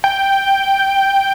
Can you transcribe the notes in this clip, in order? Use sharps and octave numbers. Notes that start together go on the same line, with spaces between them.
G5